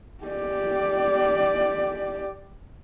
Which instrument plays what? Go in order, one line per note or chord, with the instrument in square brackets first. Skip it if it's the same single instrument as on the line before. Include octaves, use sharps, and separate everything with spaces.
[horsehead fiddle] G4 D5